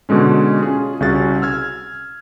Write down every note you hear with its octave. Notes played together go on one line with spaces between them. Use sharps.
B2 D3 G#3 C#4
C#4 F4 G#4
C2 C#3 C#4 F#4 G#4 A6
E6 F6 G#6